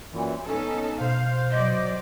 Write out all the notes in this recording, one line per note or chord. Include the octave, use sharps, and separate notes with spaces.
F#2 A#2 E3
B3 C#4 D#4 A4
B2 C5 F5
F#3 D5 D#5